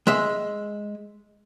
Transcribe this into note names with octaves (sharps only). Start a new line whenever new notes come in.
G#3 E5